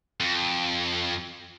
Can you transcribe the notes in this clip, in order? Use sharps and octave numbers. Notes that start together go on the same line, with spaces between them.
F2